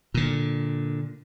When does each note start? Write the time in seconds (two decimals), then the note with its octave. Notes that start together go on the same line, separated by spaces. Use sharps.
0.14 A#2 D3